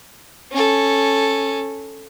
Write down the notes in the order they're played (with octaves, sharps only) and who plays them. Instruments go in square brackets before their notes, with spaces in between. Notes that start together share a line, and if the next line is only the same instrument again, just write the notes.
[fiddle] C#4 A4